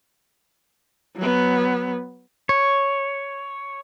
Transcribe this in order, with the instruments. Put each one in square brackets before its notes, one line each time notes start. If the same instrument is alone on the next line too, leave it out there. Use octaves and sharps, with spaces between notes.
[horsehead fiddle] F#3 B3
[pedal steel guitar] C#5